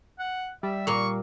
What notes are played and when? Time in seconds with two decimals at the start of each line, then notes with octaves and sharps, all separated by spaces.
0.19 F#5
0.63 G3 E5
0.87 A#2 A#3 C#6